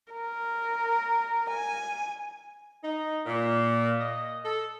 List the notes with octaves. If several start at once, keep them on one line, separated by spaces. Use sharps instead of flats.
A#4
G#5
D#4
A#2
D#5
A4